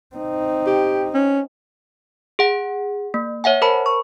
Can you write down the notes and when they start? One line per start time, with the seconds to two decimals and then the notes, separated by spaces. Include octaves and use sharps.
0.15 C4 D#4
0.67 G4
1.14 C#4
2.39 G#4 F#5
3.14 A#3
3.44 C#5 E5 F#5 G#5
3.62 A#4 C5 A5 B5
3.86 C#6